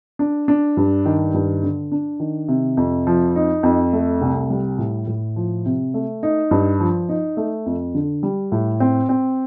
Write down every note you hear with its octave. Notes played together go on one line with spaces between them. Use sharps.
D4
D4
G2
D#3
G2
D3
D4
D#3
C3
F2
F3
D#4
F2
A3
C2
G3
A2
A2
F3
C3
A3
D#4
G2
F3
D#4
A3
F2
D3
G3
A2
C4
C4